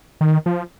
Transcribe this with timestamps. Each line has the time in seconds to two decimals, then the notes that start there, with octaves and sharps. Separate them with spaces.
0.21 D#3
0.46 F3